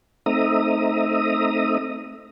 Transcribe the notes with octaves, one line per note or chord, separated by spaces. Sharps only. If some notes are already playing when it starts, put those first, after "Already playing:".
A3 C4 D#4 E5 A#5 D#6